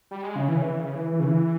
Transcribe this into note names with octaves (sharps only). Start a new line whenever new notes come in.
G3
G#3
C#3
E3
C#3
E3
C#3
E3
E3
C#3
E3